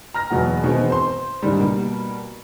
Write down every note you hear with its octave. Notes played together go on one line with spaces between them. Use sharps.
A#5 F6 A#6
E2 B2 F#3 G#3 F#5
B2 D#3 E3 G#3 C4
C5 C6
G#2 D3 D#3 G3
B2 G3 A#3